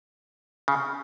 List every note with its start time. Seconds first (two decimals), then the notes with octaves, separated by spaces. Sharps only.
0.68 C#3